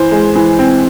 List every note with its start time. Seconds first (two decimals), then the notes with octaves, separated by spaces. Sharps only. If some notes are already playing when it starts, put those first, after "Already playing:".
Already playing: E3 C5
0.11 G#3
0.35 E3
0.59 C4